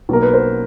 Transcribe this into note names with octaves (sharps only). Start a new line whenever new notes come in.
B1 B2 F#3 A#3 A#4
B4
A#4 C5